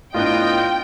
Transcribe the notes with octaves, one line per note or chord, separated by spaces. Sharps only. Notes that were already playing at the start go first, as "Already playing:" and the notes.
A2 B3 D4 F4 D#5 G5 F#6